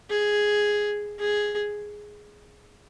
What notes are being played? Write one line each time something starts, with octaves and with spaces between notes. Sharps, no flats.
G#4
G#4